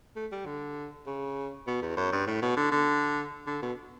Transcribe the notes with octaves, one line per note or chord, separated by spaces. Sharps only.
A3
G3
D3
C#3
B2
E2
F#2
G2
A2
B2
D3
D3
D3
B2